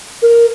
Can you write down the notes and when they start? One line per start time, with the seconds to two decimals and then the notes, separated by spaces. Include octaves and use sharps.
0.22 A#4